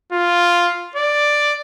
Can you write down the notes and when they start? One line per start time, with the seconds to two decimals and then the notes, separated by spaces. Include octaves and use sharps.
0.12 F4
0.96 D5